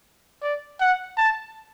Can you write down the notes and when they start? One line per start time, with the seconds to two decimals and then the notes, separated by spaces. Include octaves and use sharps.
0.43 D5
0.80 F#5
1.17 A5